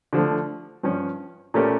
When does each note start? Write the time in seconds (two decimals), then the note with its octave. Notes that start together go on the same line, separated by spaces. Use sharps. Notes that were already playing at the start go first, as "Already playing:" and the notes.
0.13 D3 F3 A3
0.83 G2 F3 C#4
1.54 A#2 A3 C#4 G4 A#4